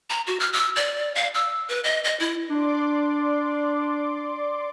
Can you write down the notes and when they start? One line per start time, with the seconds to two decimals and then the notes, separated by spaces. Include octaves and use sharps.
0.10 A#5
0.27 F#4
0.40 F6
0.53 E6
0.76 D5
1.15 F5
1.35 E6
1.69 B4
1.84 D#5
2.04 D#5
2.20 E4
2.50 D4 D5 C6 D6